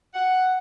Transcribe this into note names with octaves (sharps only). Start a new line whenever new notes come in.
F#5